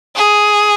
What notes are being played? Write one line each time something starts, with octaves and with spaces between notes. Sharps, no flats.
G#4